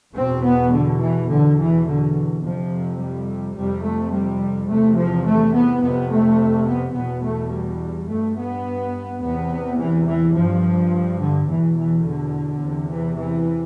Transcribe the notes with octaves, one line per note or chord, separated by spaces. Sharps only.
E2 B2 C4
B3
D3
E3
E2 B2 D3
E3
D3
F2 C3 F3
G3
F2 C3 G3
A3
G3
E2 C3 A3
F3
A3
B3
F2 C3 B3
A3
B3
E2 B2 B3
A3
G3
G2 A3
B3
E2 C3 B3
E3
E3
G2 F3
D3
E2 B2 E3
E3
D3
E2 C3
E3
E3